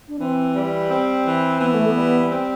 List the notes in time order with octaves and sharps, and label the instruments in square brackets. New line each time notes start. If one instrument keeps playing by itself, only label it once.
[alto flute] D4
[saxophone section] E3 [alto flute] C4
[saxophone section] G3
C4
E3
[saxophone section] E3 [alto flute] B3
[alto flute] A3
B3
[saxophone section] G3
C4